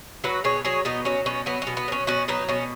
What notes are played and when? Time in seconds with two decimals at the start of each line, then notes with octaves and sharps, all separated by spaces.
0.24 F#3 F#4 B4
0.44 B2 G#4 C#5
0.65 F#3 G#4 C#5
0.85 B2 B3 D#4
1.05 F#3 C#4
1.26 B2 C#4
1.46 F#3 B3
1.62 B2 C#4
1.77 B3
1.88 F#3 C#4
2.07 B2 C#4 F#4
2.28 F#3 B3 D#4
2.48 B2 C#4